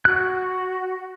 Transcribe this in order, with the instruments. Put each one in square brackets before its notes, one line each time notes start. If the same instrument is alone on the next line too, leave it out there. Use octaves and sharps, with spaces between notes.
[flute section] F#4 [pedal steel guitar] F#6